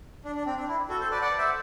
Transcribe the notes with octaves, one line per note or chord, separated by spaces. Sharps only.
D4
D4
C4
D4
E4
F#4 A4
A4 C5
B4 D5
D5 F#5
C5 E5